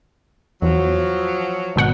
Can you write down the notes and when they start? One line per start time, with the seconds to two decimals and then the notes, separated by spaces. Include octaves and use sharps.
0.62 E2 F3 F#3
1.76 G#1 B2 F#5